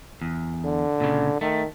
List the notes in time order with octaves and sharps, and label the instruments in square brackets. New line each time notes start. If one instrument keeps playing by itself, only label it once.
[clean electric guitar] E2
[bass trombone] D3
[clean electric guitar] A#2 C#3
[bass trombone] D#3 [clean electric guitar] A3